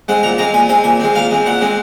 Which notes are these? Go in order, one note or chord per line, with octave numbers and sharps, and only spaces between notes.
G#3 C4 F#5
A#2 A#5
G#3 C4 A#5
A#2 G#5
G#3 C4 G#5
A#2 G#5
G#3 C4
A#2 F5
G#3 C4
A#2 F#5
G#3 C4